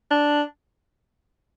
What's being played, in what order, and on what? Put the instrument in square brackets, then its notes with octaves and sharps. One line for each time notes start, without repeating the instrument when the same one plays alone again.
[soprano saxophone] D4